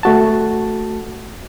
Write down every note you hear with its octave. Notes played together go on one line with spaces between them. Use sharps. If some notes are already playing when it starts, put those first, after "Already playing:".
A3 F#4 A5